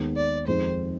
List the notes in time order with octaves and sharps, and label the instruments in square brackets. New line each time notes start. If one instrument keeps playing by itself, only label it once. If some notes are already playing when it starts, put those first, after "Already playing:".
Already playing: [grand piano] D#2 D#3 G#3 B3
[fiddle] D5
[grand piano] F2 D#3 G#3 C4 D#4 [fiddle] C5